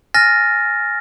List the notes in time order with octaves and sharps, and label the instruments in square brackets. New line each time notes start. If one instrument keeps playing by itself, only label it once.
[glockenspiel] G#5 F6 A6 A#6